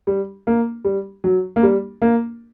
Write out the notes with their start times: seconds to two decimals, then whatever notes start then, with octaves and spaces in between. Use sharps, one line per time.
0.07 G3
0.47 A#3
0.85 G3
1.24 F#3
1.56 A#3
1.63 G3
2.02 A#3